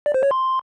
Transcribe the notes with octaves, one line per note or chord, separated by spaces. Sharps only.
D5
C5
C#5
C6